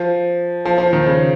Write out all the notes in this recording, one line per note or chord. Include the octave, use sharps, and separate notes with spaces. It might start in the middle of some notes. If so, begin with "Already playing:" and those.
Already playing: F3
F3
F3
D#3
C#3